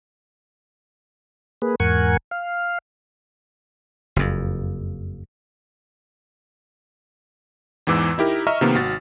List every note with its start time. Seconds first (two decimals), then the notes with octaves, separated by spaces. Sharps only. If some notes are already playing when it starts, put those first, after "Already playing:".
1.62 A#3 G#4 B4
1.80 E2 G#2 A#4 F#5 G#5 C#6
2.31 F5
4.16 F#1 F2
7.87 E2 G#2 E3 D6 E6
8.18 D#4 E4 G4 A#4
8.47 D#5 E5 A#5 C#6 F6
8.61 C3 D#3 F3 A#3 B3
8.75 G#1 F#4 A6